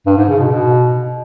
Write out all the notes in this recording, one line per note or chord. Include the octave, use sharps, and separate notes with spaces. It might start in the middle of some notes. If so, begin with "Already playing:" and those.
G2
G#2
C#3
B2
B2